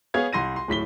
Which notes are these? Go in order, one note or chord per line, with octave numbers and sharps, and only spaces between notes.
B3 G#4 C#5 F5 G#6
C2 C6 A#6 D#7
C6
D1 A2 B6 G7